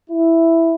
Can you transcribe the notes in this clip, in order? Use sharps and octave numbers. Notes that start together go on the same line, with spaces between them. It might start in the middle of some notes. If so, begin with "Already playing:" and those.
E4